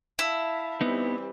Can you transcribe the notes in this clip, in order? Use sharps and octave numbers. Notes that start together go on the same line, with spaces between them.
E4 E5 F5 A5
E3 G3 B3 C4 D#4